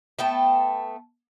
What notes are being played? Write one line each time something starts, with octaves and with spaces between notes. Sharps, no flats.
A3 B3 G5 A5